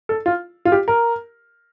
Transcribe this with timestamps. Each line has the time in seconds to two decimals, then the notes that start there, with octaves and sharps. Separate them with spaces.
0.09 A4
0.26 F4
0.65 F4
0.72 G4
0.88 A#4